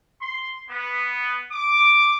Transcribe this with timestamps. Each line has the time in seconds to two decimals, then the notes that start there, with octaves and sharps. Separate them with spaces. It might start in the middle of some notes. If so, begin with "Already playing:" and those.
0.22 C6
0.69 B3
1.51 D6